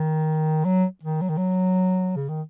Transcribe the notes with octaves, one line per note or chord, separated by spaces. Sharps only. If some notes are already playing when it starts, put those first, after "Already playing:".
Already playing: D#3
F#3
D#3
F#3
D#3
F#3
C#3
D#3